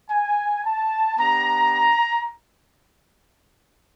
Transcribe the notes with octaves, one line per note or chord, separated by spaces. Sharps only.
G#5
A5
B3 D4 G4 A#5